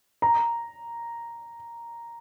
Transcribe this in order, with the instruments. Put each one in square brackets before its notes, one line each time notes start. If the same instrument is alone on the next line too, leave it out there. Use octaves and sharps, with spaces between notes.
[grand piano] A#5